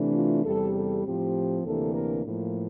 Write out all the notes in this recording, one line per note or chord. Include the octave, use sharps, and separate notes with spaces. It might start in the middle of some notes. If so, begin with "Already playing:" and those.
Already playing: C3 E3 A3 D4
F4
E2 C3 G3 A4
A4
A2 F3 C4 G4
D2 C3 E3 A#3 D4 A4
A#4
A2 F3 A#3